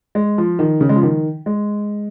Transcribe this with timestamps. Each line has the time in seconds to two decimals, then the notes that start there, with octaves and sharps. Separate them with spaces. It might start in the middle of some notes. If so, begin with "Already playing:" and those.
0.15 G#3
0.38 F3
0.59 D#3
0.81 C#3
0.89 G#3
0.96 F3
1.03 D#3
1.46 G#3